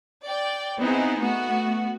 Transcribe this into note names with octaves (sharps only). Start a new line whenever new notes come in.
D5 G5
B3 C4 D#4 E4 G#4
A3 B3 F#4